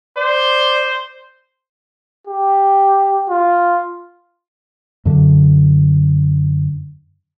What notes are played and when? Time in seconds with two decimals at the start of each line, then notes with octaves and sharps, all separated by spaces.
0.17 C5 D5
2.27 G4
3.29 F4
5.05 F#2 D3